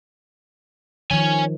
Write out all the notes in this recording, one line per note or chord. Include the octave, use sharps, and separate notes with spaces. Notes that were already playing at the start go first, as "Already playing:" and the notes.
D#3 F3 C#5 G#5